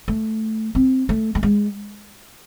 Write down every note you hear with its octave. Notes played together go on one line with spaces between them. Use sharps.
A3
C4
A3
A3
G#3